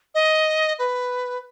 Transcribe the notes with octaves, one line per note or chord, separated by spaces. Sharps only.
D#5
B4